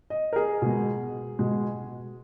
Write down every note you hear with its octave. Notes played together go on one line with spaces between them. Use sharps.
D#5
A#4
G#4
B2 G#3
B2 G#3